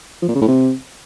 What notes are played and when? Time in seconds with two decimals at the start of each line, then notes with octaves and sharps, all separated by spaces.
0.22 F3
0.29 A#2
0.35 C#3
0.42 A2
0.48 C3